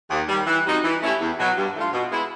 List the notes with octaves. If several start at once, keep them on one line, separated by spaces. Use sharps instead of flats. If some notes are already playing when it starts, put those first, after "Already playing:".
D#2
D#3 G3
E3
G3 C4 D#4 F#4
E3
A3 C#4 E4 G4
E2
B2 F#3
G2
E3 A3 D4 F4
B2
G#3 B3 E4